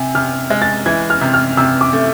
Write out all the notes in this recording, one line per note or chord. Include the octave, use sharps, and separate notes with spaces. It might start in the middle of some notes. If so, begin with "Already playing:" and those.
Already playing: C3 G#5
C3 F6
G#3
A6
E3 G#6
F6
C3
F6
C3 E6
D6
A3